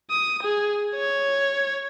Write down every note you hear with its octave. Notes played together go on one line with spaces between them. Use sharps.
D#6
G#4
C#5